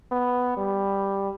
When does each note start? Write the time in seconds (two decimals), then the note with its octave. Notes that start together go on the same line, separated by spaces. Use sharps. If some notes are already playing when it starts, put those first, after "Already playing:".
0.12 B3
0.57 G3